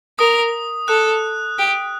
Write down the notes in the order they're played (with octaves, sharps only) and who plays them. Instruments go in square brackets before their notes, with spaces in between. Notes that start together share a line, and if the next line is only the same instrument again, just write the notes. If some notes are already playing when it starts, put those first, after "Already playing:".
[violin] A#4 [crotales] D#6
[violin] A4 [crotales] F#6
[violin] G4